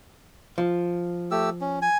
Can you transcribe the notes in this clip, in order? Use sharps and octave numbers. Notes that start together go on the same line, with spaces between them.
F3
A3 G4 E6
C#4
G#5